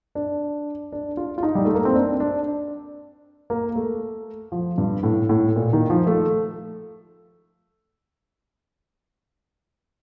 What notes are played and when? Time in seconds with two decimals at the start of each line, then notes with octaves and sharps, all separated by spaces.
0.15 D4
0.92 D4
1.17 F4
1.38 F4
1.43 D#4
1.55 G3
1.65 A3
1.75 A#3
1.85 C4
1.95 D4
2.20 D4
3.50 A#3
3.76 A3
4.52 F3
4.78 G2
5.03 A2
5.29 A2
5.56 A#2
5.73 D#3
5.90 F3
6.07 A3